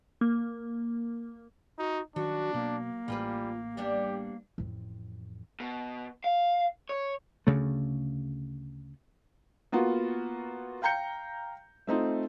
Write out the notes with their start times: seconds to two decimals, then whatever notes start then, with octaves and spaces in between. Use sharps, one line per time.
0.21 A#3
1.79 D#4 F#4
2.16 D#3 F#3 D4 F#4
2.54 B2 A#3
3.08 A1 A2 G3 F4 G#4 B4
3.77 G3 B3 D4 G4
4.58 A1 F2
5.60 B2
6.24 F5
6.89 C#5
7.47 D2 C#3 A3
9.72 A#3 B3 F4 F#4
10.82 F5 G5 A#5 G6 C#7
11.87 A3 C4 D#4 F4